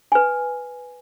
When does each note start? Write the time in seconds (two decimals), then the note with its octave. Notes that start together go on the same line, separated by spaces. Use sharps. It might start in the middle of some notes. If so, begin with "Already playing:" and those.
0.12 B4 G#5